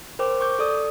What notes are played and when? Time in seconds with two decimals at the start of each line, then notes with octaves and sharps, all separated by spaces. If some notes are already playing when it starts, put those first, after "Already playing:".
0.19 A#4 C5 G5 D6
0.41 C#6 D6 G6
0.59 A4 D5 D#6